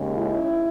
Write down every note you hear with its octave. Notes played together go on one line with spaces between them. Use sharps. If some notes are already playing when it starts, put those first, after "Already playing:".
Already playing: D#2 C#3 G#3
E4